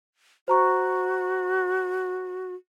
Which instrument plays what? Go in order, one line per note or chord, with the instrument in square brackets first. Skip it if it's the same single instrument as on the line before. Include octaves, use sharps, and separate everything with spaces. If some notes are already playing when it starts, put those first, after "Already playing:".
[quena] F#4 [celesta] C5 A#5 C#6